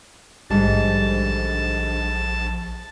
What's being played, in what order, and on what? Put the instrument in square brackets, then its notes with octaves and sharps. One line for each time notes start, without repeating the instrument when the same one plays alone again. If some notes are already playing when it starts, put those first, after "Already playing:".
[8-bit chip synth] A#1 [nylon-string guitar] G#2 D3 G3 [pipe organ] A5